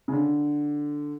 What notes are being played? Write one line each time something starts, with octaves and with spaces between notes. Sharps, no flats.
C#3
D3